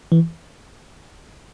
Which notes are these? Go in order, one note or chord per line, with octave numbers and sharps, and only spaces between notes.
E3